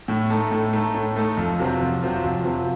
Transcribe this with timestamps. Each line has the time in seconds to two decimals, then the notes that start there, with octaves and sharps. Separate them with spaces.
0.08 A2
0.30 A3 D#4 A4
0.51 A2
0.73 A3 D#4 A4
0.95 A2
1.16 A3 D#4 A4
1.37 F2
1.59 C3 F#3 C4 F4
1.81 F2
2.02 C3 F#3 C4 F4
2.24 F2
2.45 C3 F#3 C4 F4